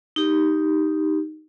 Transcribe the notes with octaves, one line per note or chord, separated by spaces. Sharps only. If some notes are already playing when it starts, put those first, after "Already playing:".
D#4 G4